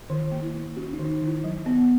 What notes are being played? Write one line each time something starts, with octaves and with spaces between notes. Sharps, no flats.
D#3
A#3
E4
A#3
C#4 F#4
D#4
D#3
D#4
D#3
E4
F#3
B3